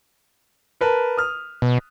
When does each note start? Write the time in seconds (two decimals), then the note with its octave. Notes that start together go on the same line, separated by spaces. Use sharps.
0.81 A#4 B4 A5
1.17 D#6 F6
1.62 B2